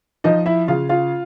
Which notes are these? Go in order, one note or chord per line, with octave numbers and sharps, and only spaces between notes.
F3 D#4 D#5
E4 E5
C#3 F4 F5
F4 F5